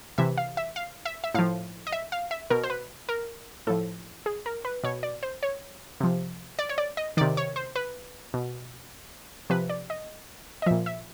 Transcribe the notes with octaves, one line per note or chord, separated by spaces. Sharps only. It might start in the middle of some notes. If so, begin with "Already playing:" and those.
C3 E3 E5
F5
E5
F5
E5
E5
A2 F3 F5
D#5
E5
F5
E5
B2 A#4
C5
B4
A#4
A2 F3 A4
G#4
A#4
B4
B2 C#5
D5
C5
C#5
C3 F3
D5
C#5
D5
D#5
C3 D#3 D5
C#5
C5
B4
B2
C3 F3 B4
D5
D#5
D#5
A#2 F3 E5
E5